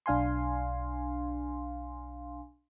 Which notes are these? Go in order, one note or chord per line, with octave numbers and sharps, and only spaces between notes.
B1 D4 F5 G#5 C6